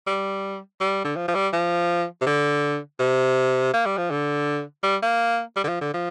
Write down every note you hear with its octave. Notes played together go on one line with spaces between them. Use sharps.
G3
G3
D3
F3
F3
G3
F3
C3
D3
C3
A#3
G3
F3
D3
G3
A#3
G3
D3
F3
D3
F3